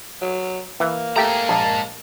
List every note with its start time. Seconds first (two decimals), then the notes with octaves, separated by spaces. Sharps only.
0.21 F#3
0.80 E3 A#3
1.16 G#3 A3 G4 A#5
1.49 A#1 A5